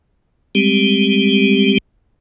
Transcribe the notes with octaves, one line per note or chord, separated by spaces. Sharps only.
G3 G#3 C4 G4